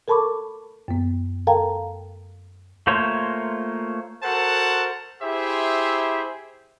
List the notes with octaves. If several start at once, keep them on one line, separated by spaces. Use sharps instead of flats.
A4 A#4 A5 B5 C#6 D6
F#2 B3
A4 A#4 F5 G5 A5 A#5
A3 A#3 F4 C5 C#5
F#4 A4 A#4 C5 F#5 A5
E4 G4 G#4 C5 E5